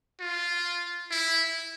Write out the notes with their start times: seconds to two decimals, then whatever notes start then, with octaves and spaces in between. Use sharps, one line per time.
0.20 F4
1.11 E4